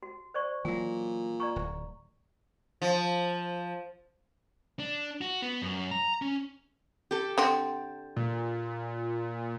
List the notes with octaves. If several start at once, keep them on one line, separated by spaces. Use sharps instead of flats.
F#4
C5 D5 C#6
A#2 E3 F#3 G#5
D5 A#5 C#6
D1 E4
F3
D4
F#4
B3
F#2
A#5
C#4
G4 A4
D3 C4
A#2